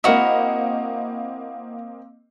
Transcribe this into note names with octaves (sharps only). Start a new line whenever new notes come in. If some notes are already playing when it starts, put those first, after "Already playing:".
A#3 C4 E4 F#4 A#4 D#5